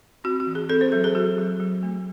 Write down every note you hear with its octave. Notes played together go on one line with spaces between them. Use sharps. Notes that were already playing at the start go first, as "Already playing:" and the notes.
C4 F#4
F#4
E3
G#4
C4 A4
C5
F#3 A4
G#4
F#3 F#4
F#3
F#3
A3